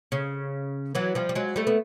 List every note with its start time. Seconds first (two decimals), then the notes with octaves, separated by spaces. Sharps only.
0.12 C#3
0.95 E3 F#3
1.15 F3 G3
1.29 G3
1.35 F#3 G#3
1.56 G3 A3
1.67 B3